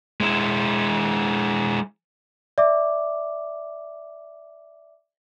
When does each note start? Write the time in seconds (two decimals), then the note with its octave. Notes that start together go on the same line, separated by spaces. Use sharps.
0.21 G#3 E4
2.58 D5 E5 D6